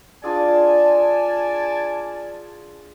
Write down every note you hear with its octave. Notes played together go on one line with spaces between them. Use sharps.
D4 F4 G#4 D5 G#5 A5